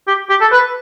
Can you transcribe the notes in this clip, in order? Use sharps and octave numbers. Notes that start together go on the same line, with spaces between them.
G4
G4
A4
B4